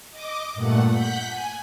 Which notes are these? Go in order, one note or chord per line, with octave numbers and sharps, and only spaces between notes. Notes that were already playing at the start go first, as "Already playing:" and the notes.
D#5 D6
G2 A#2 A3 F#5
F#5 F#6 G6 B6
G#5